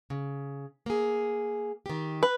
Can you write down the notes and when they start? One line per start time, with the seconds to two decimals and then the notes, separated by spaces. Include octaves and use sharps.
0.10 C#3
0.86 A#3 G#4
1.86 D#3 G4
2.23 B4